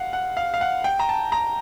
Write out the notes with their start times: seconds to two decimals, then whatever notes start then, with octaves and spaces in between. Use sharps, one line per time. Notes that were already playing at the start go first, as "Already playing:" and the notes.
Already playing: F5 F#5
0.13 F#5
0.37 F5
0.54 F5
0.61 F#5
0.84 G5
0.99 A#5
1.09 A5
1.32 A#5